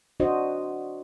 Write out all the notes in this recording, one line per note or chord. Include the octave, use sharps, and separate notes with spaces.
D4 F#4 C5 D#5